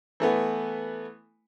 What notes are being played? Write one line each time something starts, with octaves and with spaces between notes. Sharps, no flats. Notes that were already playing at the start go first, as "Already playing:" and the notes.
E3 A3 B3